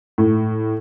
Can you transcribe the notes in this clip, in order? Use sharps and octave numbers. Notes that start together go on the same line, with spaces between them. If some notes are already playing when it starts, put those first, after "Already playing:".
A2